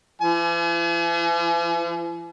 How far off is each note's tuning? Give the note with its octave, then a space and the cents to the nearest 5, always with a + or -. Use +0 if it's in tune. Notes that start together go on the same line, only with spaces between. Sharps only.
E3 +45 G#5 +40